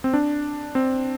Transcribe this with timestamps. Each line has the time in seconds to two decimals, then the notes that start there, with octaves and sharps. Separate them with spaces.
0.04 C4
0.14 D4
0.75 C4